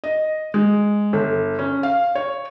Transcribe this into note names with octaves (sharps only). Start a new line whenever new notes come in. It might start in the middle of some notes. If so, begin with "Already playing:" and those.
D#5
G#3
G1
C#4
F5
C#5